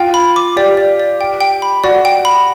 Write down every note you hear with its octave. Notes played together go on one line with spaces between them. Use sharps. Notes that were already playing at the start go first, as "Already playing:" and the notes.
Already playing: F4 G5
B5
D6
G4 D5
D5
D5
G5
G5
B5
F#4 D5
G5
B5